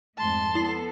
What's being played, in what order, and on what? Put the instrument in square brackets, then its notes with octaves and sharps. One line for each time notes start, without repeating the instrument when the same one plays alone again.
[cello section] F2 G#2 A3 [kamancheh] A5 C6
[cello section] B3 A4 [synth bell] E4 C7